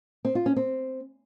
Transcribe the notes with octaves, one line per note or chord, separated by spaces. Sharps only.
C4
F4
C#4
C4